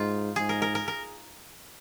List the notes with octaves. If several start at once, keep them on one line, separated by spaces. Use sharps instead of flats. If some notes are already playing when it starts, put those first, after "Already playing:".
Already playing: G#2 D#4 F4
G#2 G#4
A#4
A#4
A#4
A#4